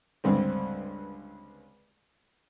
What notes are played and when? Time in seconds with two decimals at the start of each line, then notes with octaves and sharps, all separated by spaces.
0.24 C#2 G2 D3 C4